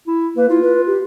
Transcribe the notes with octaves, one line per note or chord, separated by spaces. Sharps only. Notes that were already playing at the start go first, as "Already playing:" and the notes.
E4
A#3 B4
E4 F4
B4
G4